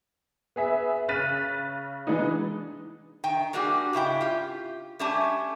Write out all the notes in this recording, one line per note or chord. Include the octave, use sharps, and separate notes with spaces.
B3 G#4 E5
C#3 F6 F#6 A6 B6 D#7
E3 G#3 B3 D4 D#4
D#3 G5
G3 A#3 D4 F#4 G#4
G#2 C#3 E4 G5
F4 G4
G3 A3 C#4 G4 G#5 A5